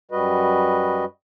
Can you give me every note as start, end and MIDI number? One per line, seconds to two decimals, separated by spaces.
0.11 1.05 42
0.11 1.05 55
0.11 1.05 66
0.11 1.05 71
0.11 1.05 75